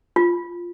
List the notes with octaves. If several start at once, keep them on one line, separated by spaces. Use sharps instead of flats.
F4